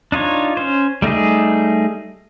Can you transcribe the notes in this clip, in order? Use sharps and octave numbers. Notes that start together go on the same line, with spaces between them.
D4 D#4 F4 C#5
C#4 C5
G3 A3 D#4 G#4